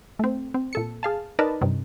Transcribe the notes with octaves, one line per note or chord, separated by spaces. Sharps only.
A3 C4
C4
A#2 A4 C#7
G#4 F5 A5
D#4 A#4 B4 D5 D#5 A5
G2 C3